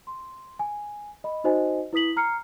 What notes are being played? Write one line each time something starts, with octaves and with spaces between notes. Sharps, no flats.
C6
G#5
D#5 B5
D#4 F#4 C5 D#5 G#5
E4 B4 D#6 B6 F#7
A#5 F6 C7 C#7